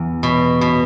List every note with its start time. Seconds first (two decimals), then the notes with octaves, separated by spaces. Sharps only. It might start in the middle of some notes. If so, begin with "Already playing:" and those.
Already playing: E2
0.23 B2
0.61 B2